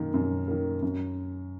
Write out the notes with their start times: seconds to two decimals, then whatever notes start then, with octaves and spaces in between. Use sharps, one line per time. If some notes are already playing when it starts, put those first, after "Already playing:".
Already playing: F#2 D#3 A#3
0.14 F#2
0.48 D#3 A#3
0.82 F#2